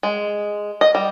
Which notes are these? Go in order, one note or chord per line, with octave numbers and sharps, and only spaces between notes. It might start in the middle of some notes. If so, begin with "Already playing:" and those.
G#3
D#5
G3